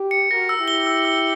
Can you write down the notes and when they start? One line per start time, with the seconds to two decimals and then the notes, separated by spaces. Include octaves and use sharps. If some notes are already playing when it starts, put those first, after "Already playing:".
Already playing: G4
0.11 C#7
0.30 F#4 A#4 A#6
0.49 E6
0.59 E4 G4
0.68 G7
0.87 E6
1.05 E6